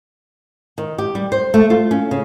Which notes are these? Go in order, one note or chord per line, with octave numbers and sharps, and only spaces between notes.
D#3
G4
G3
C5
A3
F4
C#4
C#3